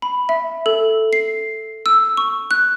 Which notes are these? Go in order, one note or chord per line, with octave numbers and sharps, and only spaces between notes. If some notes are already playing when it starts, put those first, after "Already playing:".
B5
E5
A4
C7
E6
C#6
F#6